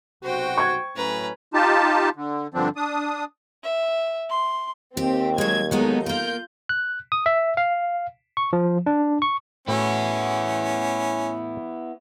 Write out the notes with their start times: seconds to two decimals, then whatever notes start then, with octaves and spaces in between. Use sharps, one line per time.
0.23 B1 C3 F#4 C5 G5
0.58 C#6 G#6
0.96 A2 F#3 C#4 B4 A#5
1.54 D#4 F4 G4 A5
2.16 D3
2.54 G2 D3 F3 C4 D4
2.76 D4 D#6
3.64 E5
4.30 C6
4.97 D#2 C4 G4
5.38 F#3 G#3 G#6
5.71 F#3 G#3 B3 D#4 A4
6.06 A#3 F4 A#4 G6
6.69 F#6
7.12 D#6
7.26 E5
7.57 F5
8.37 C#6
8.53 F3
8.86 D4
9.22 C#6
9.68 A2 B3 C#4 E4 F#4 E5